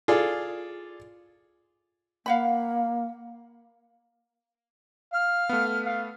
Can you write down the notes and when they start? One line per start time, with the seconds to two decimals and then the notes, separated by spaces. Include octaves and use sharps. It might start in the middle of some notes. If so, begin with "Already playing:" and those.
0.08 F4 G#4 A4 D5
2.26 A#3 F5 F#5 B5
5.13 F5 F6
5.49 A3 B3
5.85 F5